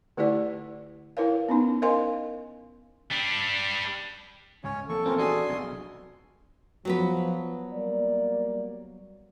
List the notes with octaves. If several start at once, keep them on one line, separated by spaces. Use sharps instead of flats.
D3 A3 E4 G4 D5 F#5
E4 A#4 B4 C#5 F5
B3 C#4 D#4
A#4 C5 D#5 F5 G#5 C6
G3 D4
C#2 G#2 C#3 C#4 C#5
F3 A#3 C4 A4 C#6
A#1 E2 C4 C#4 F4 A#4
D4 F#4 G#4 G#5 C6 D#6
F1 B1
F3 F#3 B3 B4
G3 A#3 D5